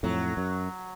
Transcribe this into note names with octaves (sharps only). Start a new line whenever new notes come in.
F2 A2 F#3
F#2